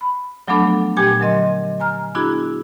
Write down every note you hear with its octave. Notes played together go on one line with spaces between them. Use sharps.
B5
F3 F#3 A3 B3 D4 A4
A#2 G4 G5 G#5 G#6
D3 F#3 A#4 D#5 C6
G#5 A#5 F6
B3 D4 E4 F#4 G#4